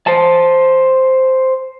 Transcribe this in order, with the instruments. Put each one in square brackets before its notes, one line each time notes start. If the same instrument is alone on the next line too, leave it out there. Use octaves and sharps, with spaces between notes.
[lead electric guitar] C5 A5